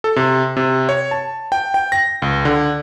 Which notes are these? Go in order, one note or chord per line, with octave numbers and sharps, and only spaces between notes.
A4
C3
C3
C#5
A5
G5
G5
A#6
C#2
D3